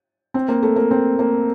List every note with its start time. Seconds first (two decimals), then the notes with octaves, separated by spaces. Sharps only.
0.34 C4
0.49 A#3
0.63 A3
0.76 A#3
0.91 C4
1.19 A#3